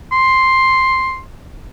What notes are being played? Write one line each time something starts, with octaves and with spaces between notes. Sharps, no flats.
C6